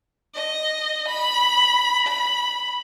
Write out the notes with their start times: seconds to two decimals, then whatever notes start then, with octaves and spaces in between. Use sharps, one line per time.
0.35 D#5
1.08 B5
2.07 B5